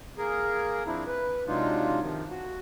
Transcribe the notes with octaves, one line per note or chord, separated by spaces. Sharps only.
A#3 G#4 A#4
F3 C4 D4 E4
B4
C3 F#3 G#3 D4 D#4 F4
C3 D#3 F3
F#4